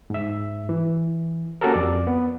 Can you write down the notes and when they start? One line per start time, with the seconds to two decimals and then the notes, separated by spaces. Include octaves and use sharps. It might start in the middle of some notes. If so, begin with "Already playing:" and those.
0.10 G#2 E5
0.69 E3
1.61 A#3 C#4 F#4 G4 A4 A#4
1.74 F2 D5
2.07 B3